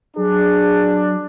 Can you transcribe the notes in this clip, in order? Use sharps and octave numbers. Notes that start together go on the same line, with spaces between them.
F#3 D4 G#4